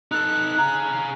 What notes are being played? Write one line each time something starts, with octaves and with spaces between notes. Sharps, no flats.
D#4 A4 F#6
G#4 F5 A#5